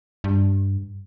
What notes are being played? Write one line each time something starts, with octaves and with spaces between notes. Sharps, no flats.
G2